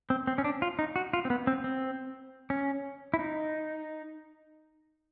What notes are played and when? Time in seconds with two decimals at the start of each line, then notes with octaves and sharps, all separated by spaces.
0.10 C4
0.27 C4
0.38 C#4
0.44 D4
0.62 F4
0.79 D#4
0.96 F#4
1.13 F4
1.25 C4
1.30 B3
1.47 C4
1.64 C4
2.50 C#4
3.14 E4
3.19 D#4